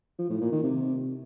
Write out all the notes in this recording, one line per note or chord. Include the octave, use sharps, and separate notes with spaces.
F3
A2
A#2
D#3
C3